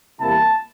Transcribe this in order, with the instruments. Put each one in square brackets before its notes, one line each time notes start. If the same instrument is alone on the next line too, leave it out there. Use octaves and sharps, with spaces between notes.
[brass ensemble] E2 C3 G3 A#3 E4 A5